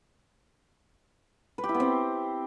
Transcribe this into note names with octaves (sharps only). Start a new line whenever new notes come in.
B4
G4
E4
B3
C4